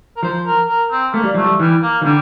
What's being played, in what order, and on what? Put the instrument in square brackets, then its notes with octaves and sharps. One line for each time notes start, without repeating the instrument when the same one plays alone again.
[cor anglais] A#4
[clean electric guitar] F3 [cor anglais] C5
[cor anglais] A#4
A#4
C4
[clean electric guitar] A3 [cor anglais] A#3
[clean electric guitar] G3
[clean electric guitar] F3 [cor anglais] A3
[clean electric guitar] G3
[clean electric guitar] E3 [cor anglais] G3
[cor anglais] A#3
[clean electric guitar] E3
[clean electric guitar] D3 [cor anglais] G3